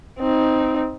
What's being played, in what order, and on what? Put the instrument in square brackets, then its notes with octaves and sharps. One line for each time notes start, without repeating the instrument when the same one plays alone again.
[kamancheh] C4 D#4